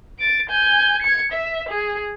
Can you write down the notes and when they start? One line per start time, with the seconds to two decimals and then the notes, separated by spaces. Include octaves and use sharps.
0.19 A6 D7
0.50 G#5 G6
1.02 G#6 C#7
1.32 E5
1.69 G#4